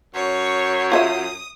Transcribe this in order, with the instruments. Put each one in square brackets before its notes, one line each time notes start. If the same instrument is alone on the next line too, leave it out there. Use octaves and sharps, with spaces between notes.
[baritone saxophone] F#2 [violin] C#5
[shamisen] F4 C#5 E5 [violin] D#6